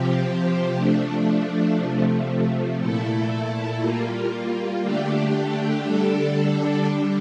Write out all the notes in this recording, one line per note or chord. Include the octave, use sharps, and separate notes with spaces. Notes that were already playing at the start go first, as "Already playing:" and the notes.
Already playing: C3 F3 C4 G4
F3 A3 D4
C3 F3 A3
A#2 A3 E4 A4
G3 A#3 F4
D3 A3 D4 G4
D3 G3 D4 A4
D3 G3 D4